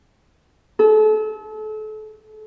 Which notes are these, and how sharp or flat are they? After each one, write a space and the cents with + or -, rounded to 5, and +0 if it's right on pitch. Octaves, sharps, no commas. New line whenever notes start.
A4 -35